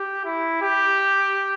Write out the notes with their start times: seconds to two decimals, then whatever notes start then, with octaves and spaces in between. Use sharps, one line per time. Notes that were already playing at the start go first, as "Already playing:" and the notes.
Already playing: G4
0.25 E4
0.62 G4